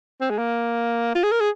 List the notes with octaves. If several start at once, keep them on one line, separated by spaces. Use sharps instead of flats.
C4
G#3
A#3
F4
G#4
A#4
G#4